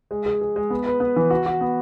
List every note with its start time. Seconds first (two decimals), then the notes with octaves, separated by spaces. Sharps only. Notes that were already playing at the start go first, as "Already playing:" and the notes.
0.11 G#3
0.26 G#4
0.41 G#4
0.56 G#3
0.70 B3
0.86 B4
1.00 B3
1.16 E3
1.30 F#4
1.46 F#4
1.61 B3